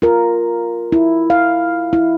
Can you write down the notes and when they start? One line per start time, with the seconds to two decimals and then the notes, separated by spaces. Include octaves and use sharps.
0.02 F4 A#4
0.92 E4
1.30 F5
1.93 E4